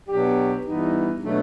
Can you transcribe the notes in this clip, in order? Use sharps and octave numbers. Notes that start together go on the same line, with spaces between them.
B2 F#3 B3 D4 G4
G2 E3 G3 B3 D#4
B2 F#3 A3 D4